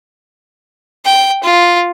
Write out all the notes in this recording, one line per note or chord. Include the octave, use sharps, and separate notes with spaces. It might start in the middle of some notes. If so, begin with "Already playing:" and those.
G5
F4